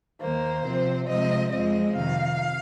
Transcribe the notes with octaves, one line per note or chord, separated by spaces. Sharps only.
D#2 D#3 A#3 C5
C3 F3 C4
C3 F3 G#3 C4 D#5
F2 F3 G#3 C4 D#5
F2 C3 D#3 F5